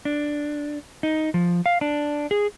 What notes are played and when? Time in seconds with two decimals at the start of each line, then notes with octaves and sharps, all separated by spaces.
0.05 D4
1.03 D#4
1.34 F3
1.66 F5
1.81 D4
2.31 G#4